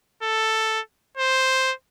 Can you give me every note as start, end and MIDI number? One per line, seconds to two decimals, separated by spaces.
0.23 0.80 69
1.17 1.73 72